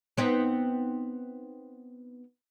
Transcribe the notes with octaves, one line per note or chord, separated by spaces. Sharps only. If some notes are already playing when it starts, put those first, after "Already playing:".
B3 C4 D#4